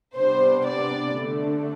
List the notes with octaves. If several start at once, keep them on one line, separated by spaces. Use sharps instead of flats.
C3 G3 B3 D4 C5
D5
D3 A3 D4